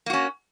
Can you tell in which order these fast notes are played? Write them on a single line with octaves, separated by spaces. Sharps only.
A#3 F#4 C#4